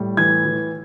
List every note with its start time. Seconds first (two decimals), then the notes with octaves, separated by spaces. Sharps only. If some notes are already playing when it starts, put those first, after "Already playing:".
Already playing: A2 G3
0.17 E3 G#6
0.45 E3